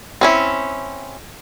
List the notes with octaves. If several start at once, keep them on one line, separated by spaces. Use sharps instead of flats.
C4 C#4 E4